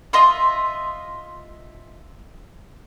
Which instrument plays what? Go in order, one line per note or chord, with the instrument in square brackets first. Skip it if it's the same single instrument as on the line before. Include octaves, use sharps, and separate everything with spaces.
[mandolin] F4 D#5 E5 C6